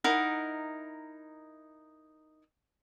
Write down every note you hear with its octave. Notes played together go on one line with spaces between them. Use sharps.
D#4 E4 A#4 F#5